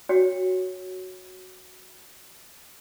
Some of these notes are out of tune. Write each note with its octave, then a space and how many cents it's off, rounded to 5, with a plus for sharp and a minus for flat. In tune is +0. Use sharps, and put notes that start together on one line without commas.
F#4 +0 C#5 +0 G5 +30